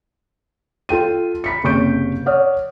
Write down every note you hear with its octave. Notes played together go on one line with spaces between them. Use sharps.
F4 A4 G5 D#7
B5 B6 C#7
F#1 C3 C#6 G6 D7
C#5 D5 F#5 D#6 F6